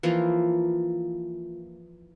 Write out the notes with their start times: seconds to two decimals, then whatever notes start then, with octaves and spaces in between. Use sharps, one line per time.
0.03 E3 F3 A#3 F4